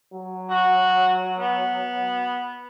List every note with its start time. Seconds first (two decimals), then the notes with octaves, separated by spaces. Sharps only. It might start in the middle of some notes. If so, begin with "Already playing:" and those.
0.14 F#3
0.50 F#4
1.40 B3